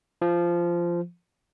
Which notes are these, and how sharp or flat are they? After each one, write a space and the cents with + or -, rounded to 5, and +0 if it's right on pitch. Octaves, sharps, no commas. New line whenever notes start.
F3 -15